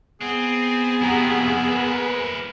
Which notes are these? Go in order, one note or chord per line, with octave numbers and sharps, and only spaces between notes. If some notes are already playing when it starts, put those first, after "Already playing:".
B3 C4 G#4
F2 A#3 E4 G4 A#5
A#4 B4